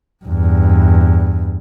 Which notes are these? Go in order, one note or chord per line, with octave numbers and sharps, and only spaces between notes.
E2 G2